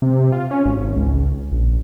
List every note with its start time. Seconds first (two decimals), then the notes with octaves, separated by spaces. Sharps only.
0.02 C3
0.32 F4
0.51 C#4
0.66 G#1
0.96 C#2
1.52 A#1